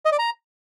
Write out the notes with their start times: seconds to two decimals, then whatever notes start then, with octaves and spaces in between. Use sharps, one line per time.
0.05 D#5
0.12 D5
0.19 A#5